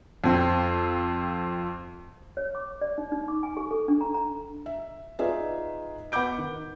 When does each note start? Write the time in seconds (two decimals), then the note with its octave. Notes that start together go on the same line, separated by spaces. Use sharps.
0.24 F2 C4
2.37 C#5
2.55 D6
2.81 D5
2.98 D#4
3.12 D#4
3.28 D6
3.43 G#5
3.57 G#4
3.71 A4
3.88 D4
4.01 A#5
4.14 A#5
4.66 E5
5.19 D#4 F4 G#4 B4 D5 E5
6.12 B3 F#5 B5 D6 G6 D7
6.38 D#3